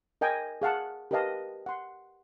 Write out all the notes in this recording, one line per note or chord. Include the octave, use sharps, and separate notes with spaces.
A#4 D#5 G5 G#5
G#4 F5 F#5 A5
G4 A#4 B4 D#5 F5 A5
F#5 C6